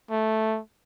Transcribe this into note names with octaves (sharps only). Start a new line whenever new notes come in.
A3